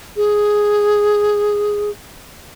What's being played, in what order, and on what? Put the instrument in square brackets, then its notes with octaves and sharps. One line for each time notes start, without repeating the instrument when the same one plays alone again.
[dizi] G#4